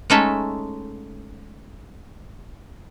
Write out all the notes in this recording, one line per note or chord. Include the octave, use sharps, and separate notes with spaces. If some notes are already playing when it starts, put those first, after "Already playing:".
G#3 A3 C#4 D#4 A4 E5